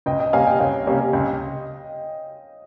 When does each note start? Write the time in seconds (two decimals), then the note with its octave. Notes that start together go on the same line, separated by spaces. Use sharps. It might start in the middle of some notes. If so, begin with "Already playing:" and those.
0.06 C#2 D#5 G5
0.20 D#5 G5
0.33 C3 G3 A#3 C#4 F5 G#5
0.46 D#5 G5
0.60 C#2 C#5 F5
0.87 C3 G3 A#3 C#4
1.13 C#2 D#5 G5